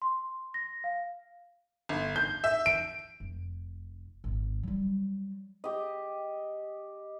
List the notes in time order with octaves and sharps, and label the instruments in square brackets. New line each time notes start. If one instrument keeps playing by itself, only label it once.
[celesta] C6
A#6
F5
[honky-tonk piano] G1
G6
E5
D7
[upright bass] F1
G#1
F#3 G3
[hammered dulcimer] G4 D#5